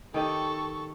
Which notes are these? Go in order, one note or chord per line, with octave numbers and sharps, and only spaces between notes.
D#3 D#4 G4 A4 C#6